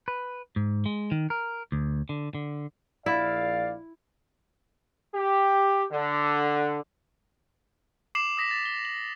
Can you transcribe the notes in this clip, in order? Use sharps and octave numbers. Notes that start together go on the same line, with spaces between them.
B4
G#2
G#3
D#3
A#4
D2
D3
D3
A#1 E4 D5 F5
G4
D3
D6 C7 E7 F#7
D#6 A#6 B6
A6
G7
F#7